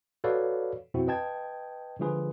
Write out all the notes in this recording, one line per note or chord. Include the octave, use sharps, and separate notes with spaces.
F#4 A4 B4 C#5 D5 F5
F2 B2 C4 E4 F#4
B4 D#5 G5 A5 G#6
D3 F3 G#3 F4 G#4 B4